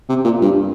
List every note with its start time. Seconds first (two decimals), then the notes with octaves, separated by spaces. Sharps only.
0.09 C3
0.25 A#2
0.42 G2